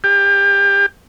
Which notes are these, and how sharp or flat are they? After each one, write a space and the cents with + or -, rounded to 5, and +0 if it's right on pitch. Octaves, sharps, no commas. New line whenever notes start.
G4 +30